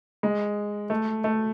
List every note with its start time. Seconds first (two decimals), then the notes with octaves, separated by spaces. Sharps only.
0.23 G#3
0.90 A3
1.24 A3